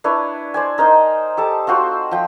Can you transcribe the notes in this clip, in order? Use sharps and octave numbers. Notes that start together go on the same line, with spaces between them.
D4 E4 B4 C#5
C5 D5 G#5
D#4 A#4 C5 D#5
G4 A4 A5
C4 F4 F#4 C5
F3 G5